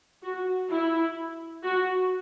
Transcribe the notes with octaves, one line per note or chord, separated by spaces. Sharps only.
F#4
E4
F#4